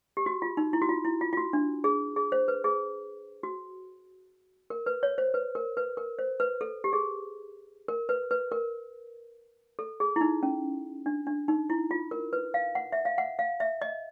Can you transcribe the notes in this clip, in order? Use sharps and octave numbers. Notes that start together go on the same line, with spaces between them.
G4
F#4
F4
D#4
E4
F#4
F4
E4
F4
F4
F#4
D4
G#4
G#4
C5
B4
G#4
F#4
A#4
B4
C#5
C5
B4
A#4
B4
A#4
C5
B4
A4
G4
G#4
A#4
B4
B4
A#4
A4
G#4
E4
D#4
C#4
D4
D4
D#4
E4
F4
A#4
B4
F5
F#5
E5
F5
F#5
F5
E5
D#5